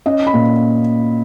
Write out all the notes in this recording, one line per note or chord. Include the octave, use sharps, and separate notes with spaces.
C#4 D#5
B5
A#2